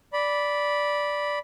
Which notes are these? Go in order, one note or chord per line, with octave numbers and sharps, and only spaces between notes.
D5 B5